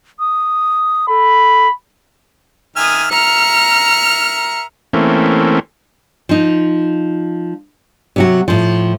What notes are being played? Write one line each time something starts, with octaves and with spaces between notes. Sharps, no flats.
D#6
A4 B5
D#3 E5 G#5 D#6 F6
A#4 E5 A#5 F6 C#7
E3 A3 A#3 C4 C#4
F3 D#4
C3 F#3 F#4
A2 F3